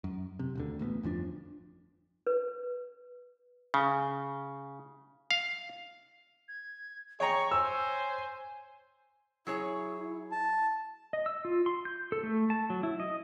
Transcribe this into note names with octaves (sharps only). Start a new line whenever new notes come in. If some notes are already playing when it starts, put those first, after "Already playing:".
F#2
C3
D#1 D2 D3
A1 D2 A#3 B3
G1 F2 F3 D4
B4
C#3
F5
G#6
G#4 C#5 G5 A#5 C#6
C5 G#5 E6
F#3 E4 G#4 C#5
A5
D#5
E6
F4
C6
G6
A4
A3
A5
F#3
E4
D#5